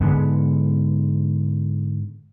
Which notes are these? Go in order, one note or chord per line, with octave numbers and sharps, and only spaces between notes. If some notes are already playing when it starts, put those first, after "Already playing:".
G#2 D3 G#3 B3